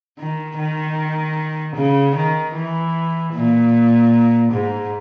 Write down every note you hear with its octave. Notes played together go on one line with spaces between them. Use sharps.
D#3
D#3
C#3
D#3
E3
A#2
G#2